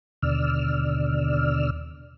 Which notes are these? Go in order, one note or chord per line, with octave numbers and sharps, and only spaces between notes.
D#2 B2 D3 D5 E6 F6